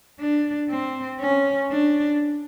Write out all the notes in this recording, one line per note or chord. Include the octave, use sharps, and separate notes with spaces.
D4
C4
C#4
D4